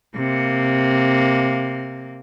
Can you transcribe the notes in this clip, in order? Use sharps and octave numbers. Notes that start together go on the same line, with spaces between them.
C3 A#3